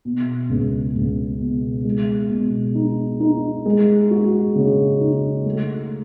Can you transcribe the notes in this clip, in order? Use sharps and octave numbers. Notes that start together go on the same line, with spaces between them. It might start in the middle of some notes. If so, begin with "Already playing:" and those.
B2
C#2
C#2
B2
G#3
B2
D#4
D#4
G#3
F#4
C#3
D#4
A3